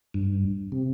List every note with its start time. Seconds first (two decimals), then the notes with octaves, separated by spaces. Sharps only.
0.14 G2
0.72 C3